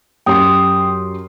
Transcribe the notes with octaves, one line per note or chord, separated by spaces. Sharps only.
F#2 G4 G5 C6 D#6